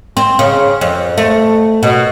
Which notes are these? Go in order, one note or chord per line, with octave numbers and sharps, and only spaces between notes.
C4
C#3
F2
A3
B2